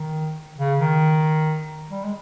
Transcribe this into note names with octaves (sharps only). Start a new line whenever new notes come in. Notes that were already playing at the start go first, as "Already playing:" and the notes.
Already playing: D#3
C#3
D#3
G3
G#3